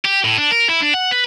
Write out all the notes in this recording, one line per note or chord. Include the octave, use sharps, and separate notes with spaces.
G4
A2
D4
A#4
E4
D4
F#5
B4